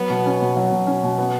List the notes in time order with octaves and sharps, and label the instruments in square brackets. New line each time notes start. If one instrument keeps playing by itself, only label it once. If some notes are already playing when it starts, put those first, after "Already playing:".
Already playing: [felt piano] F#3 [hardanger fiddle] B3
[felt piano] B2
C#4
B2
F#3
B2
C#4
B2
B3